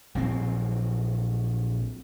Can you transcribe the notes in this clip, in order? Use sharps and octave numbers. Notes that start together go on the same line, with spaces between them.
A#1 F#3 C4